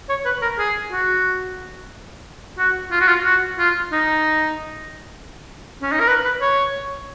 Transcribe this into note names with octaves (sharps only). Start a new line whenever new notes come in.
C#5
B4
A#4
G#4
F#4
F#4
F4
F#4
F4
F#4
F4
D#4
C#4
D#4
A#4
B4
B4
C#5